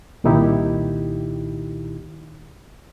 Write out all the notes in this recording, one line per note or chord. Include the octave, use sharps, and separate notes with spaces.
C2 A#2 D#3 D#4 E4 G4